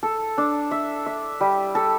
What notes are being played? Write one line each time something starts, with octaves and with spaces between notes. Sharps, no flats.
A4
D4
E5
E5
G3
A4